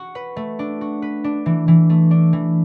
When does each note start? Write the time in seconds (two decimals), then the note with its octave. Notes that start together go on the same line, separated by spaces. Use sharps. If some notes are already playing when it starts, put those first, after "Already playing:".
Already playing: F#4
0.15 B4
0.36 A3
0.59 D4
0.81 F#4
1.02 B4
1.24 D4
1.46 E3
1.68 E3
1.90 A3
2.11 D4
2.33 E3